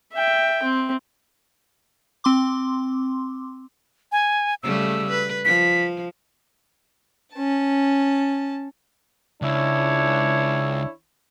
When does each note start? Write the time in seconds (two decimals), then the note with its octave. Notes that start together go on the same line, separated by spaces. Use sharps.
0.14 E5 G5
0.63 C4
2.24 C4 C6 D6
4.12 G#5
4.63 C#3 G3 A3 E6
5.10 B4
5.45 F3 B6
7.34 C#4 A5
9.42 C#2 D4 E4 C#5